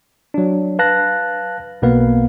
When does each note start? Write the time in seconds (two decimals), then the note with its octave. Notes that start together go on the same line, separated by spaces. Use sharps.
0.34 F#3 D4
0.79 B4 F5 A5 F#6 A#6
1.82 B1 B2 A#3 B3 B4 F5